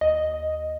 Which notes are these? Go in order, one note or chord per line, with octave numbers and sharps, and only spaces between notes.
D#2 D#5